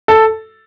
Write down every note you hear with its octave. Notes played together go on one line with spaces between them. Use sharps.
A4